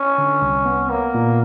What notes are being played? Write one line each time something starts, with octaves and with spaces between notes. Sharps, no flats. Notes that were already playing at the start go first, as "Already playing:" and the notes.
Already playing: C#4
D3
C2
B3
A#3 B3
A#2